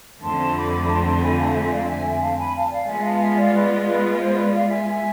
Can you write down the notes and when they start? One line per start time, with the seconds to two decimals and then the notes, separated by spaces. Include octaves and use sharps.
0.22 F2 D3 A3 C4 A5 C6
0.56 B5 D6
0.88 A5 C6
1.05 A5 C6
1.22 G#5 B5
1.39 F5 A5
1.50 F5
1.55 E5 G#5
1.72 D5 F5
1.88 E5 G#5
2.05 E5 G#5
2.21 F5 A5
2.38 G#5 B5
2.55 F5 A5
2.64 G#5
2.71 D5 F5
2.87 G#3 B3 F4 E5 G#5
3.04 F5 A5
3.20 E5 G#5
3.37 D5 F5
3.54 B4 D5
3.87 B4
4.20 C5
4.36 B4 D5
4.53 D5 F5
4.69 E5 G#5